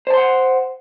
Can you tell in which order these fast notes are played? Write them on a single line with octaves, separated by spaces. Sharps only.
C5 A5 C6 F#5